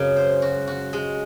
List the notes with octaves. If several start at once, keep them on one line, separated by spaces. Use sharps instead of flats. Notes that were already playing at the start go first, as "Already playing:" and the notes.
Already playing: F#2 C#3 G#3
C5
F#4
F#4
G#3